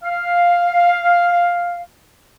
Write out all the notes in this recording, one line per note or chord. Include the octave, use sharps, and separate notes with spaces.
F5